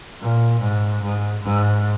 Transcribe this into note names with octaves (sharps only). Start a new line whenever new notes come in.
A#2
G#2
G#2
G#2